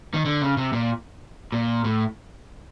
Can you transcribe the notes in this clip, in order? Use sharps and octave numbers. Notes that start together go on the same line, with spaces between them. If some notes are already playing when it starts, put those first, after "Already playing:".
D#3
D3
C#3
C3
A#2
A#2
A2